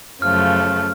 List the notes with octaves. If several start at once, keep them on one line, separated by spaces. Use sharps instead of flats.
F#2 C#3 F3 A3 F6